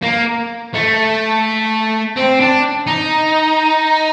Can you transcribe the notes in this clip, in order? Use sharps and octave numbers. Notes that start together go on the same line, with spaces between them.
A#3
A3
C4
D4
D#4